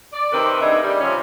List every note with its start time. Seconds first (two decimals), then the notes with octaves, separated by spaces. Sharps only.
0.13 D5
0.33 C3 D#3 C4 G4 A#4 B4
0.60 G3 D4 D#4 G#4 D#5 E5
0.83 G3
1.00 C3 F3 C#4